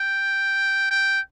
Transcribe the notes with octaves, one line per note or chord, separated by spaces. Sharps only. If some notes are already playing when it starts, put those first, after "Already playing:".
Already playing: G5
G5